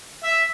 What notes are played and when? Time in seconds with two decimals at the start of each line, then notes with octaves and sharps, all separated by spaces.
0.23 E5